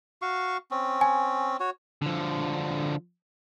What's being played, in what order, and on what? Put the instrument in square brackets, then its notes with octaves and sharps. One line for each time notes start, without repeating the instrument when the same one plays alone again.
[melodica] F#4 F5 C#6
C4 C#4
[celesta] G#5
[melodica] F#4 C#5
[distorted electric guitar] D3 F3